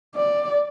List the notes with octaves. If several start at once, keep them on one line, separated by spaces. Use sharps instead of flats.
D5